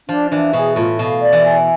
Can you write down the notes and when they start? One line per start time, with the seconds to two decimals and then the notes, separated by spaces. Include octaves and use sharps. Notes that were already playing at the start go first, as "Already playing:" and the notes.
0.09 F3 D4
0.31 E3 D4
0.53 B2 G#4
0.76 A2 F4
0.99 B2 F5
1.22 D5
1.32 E3
1.44 G#5